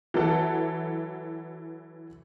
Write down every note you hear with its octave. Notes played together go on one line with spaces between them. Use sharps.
E3 F#3 A4 F#5